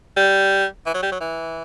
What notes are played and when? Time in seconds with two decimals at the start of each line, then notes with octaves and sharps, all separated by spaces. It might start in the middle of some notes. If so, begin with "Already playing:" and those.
0.17 G3
0.86 E3
0.94 F#3
1.03 G3
1.12 F#3
1.21 E3